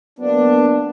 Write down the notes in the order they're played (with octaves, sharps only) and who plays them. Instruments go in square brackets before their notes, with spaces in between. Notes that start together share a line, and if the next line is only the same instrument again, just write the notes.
[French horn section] F#3 A#3 B3 [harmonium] D4